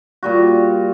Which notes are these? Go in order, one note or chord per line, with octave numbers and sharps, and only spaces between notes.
A#2 G3 F#4